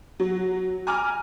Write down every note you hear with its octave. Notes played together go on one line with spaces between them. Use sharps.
F#3
G#5 A#5 D6 F6